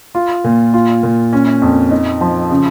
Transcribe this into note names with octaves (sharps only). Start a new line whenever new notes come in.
F4
A#2
F4
A#2
C#4
F2
D#4
F3
C#3